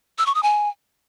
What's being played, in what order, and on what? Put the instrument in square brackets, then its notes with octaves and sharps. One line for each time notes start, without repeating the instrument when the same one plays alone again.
[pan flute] E6
C#6
D#6
G#5